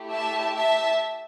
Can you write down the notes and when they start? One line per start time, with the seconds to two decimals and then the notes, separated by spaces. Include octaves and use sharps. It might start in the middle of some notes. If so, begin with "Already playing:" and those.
Already playing: A3 E4 G4
0.11 E5 A5
0.55 E5 A5